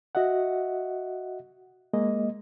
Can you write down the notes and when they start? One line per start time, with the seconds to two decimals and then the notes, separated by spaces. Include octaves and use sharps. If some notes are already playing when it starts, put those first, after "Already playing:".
0.15 F#4 D#5 E5 F#5
1.93 G#3 A#3 D#5